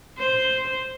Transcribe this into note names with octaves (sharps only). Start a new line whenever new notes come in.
C5